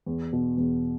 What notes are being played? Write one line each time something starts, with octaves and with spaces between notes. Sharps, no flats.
E2
B2
E2